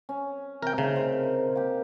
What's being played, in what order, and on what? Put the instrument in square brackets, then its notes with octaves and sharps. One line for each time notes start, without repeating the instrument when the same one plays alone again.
[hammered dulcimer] C#4
[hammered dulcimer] C3 [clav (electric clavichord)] A#4 G5
[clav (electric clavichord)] C#3 [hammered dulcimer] A3 D#4
[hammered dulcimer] A#4 C5
A#3 G4